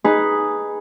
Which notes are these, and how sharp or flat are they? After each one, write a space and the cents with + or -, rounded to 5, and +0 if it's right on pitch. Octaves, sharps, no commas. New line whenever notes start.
D#4 +0 G#4 +0 B4 +0